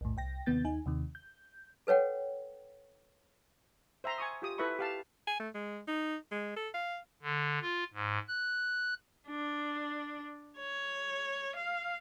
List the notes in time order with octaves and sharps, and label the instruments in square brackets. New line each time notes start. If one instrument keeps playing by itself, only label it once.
[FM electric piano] B1 E2 A2
C2 G5 A#6
D#2 C3 D#3 B3 G6 A6
D#2 D#4 G#5
D#2 C3 D#3
G6
[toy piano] A4 B4 C#5 F#5 G5
[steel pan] C5 E5 G5 A#5 C6
G#5 C#6 D#6
F4 G4 D#6
E4 A4 B4 E5 B5 C#6
G4 F5 A5
[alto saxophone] G#5
A3
G#3
D#4
G#3
A4
F5
[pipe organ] D3
F4
G#2
F#6
[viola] D4
C#5
F5